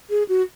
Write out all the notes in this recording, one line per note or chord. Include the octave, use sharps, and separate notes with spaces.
G#4
F#4